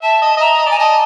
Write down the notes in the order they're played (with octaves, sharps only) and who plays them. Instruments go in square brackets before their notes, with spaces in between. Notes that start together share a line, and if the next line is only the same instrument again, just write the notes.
[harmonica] E5 [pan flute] A5
[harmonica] D#5
D#5
[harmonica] E5 [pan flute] A#5
[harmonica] D#5
[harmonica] D5 [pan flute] G#5
[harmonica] D#5 [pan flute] A5